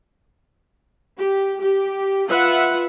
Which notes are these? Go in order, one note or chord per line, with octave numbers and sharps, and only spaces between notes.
G4
G4
F4 B4 E5 F#5